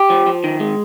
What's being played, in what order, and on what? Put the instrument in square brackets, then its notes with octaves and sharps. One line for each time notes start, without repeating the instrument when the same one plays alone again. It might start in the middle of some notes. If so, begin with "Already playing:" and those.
Already playing: [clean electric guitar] G4
F3
F3
D#3
G#3